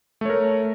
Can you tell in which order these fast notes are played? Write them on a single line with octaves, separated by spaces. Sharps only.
A3 C#5 A#4